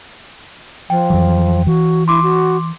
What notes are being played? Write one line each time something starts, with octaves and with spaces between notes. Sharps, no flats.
F3 G5
F2 E3 F#3
E3 F#4
E4 C6 D6
F#4